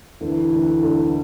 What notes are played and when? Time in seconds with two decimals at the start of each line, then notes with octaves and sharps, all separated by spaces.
0.21 D2 E3
0.52 D2
0.83 D2